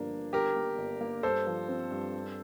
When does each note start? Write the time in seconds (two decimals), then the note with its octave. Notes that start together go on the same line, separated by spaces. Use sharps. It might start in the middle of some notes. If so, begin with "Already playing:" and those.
Already playing: G1 G2 F3 A#3 D4
0.10 G2
0.33 G1 G4 A#4
0.56 A#3
0.78 G1
1.01 A#3
1.23 G2 A4 C5
1.47 F3
1.68 C4
1.91 G2
2.14 G3